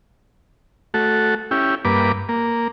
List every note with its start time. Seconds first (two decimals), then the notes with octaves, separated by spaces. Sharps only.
0.94 A3 F#4 A4
1.51 C#4 E4 G4
1.85 G2 A#3 B4 D6
2.29 A#3